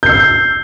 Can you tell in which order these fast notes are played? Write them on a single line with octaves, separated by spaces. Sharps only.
G6 C7 E6